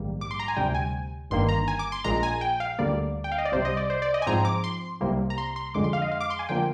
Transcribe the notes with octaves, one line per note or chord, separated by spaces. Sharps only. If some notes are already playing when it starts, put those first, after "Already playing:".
Already playing: A#1 G#2 D#3 G3 A#3
D6
C6
A#5
G#5
D2 C3 G3 G5
G#5
G1 G2 D#3 A#3 C6
A#5
G#5
D6
C6
A#1 A#2 G#3 A#5
G#5
G5
F5
D2 D3 G3 A#3 D5
G5
F5
D#5
D5
C2 C3 G3 C5
D#5
D5
C5
D5
D#5
G#5
G#2 F3 C4 A#5
D6
C6
C2 C3 G3 A#3
A#5
C6
C6
F2 D3 G#3 D6
C6
F5
D#5
F5
D6
C6
G#5
D3 F3 A#3 G5